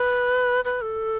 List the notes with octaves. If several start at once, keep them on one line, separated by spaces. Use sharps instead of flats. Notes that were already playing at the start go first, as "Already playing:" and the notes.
Already playing: B4
B4
A4